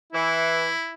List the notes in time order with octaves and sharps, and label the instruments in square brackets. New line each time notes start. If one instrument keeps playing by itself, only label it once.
[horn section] E3 [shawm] E4